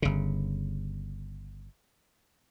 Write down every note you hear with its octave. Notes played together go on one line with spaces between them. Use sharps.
G1 C#3